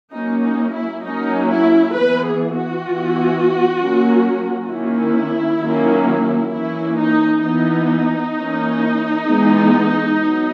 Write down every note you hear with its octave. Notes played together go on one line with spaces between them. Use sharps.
F#3 A#3 C#4 D#4
D#4
E4
F#3 A#3 C#4 D#4
E4
E3 B3 B4
G#4
F#4
E3 B3
F#3 A#3 C#4
D#3 A#3 C#4 E4
D#3 F#3 A#3 C#4
E3 A#3 C#4 E4
D#4
E3 B3 D#4
E3 A#3 C#4
E3 G#3 B3
F#3 B3